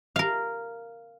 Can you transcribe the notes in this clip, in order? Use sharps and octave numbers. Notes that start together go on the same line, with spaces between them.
A#4 F5